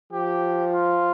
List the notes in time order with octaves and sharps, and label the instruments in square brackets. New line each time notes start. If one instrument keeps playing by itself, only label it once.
[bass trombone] F3 [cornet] G4
[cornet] F4